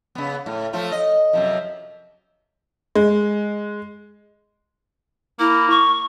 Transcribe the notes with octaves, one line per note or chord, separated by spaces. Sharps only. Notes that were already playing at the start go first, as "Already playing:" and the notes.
C#3 B3
A2
F3 A3 F4
D#5
F#2 C3 F3
G#3
A#3 E4
C#6